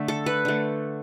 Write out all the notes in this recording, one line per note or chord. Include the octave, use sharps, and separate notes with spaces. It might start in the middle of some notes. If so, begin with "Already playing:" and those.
Already playing: D3 A3 E5
A4
B4
D3 A3